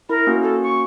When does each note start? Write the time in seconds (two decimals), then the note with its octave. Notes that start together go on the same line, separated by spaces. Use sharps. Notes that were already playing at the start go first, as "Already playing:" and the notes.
0.09 E4 A#4
0.27 A#3 C#4 F#4
0.42 A4
0.63 C#6